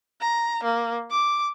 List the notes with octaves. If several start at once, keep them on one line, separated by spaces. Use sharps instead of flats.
A#5
A#3
D6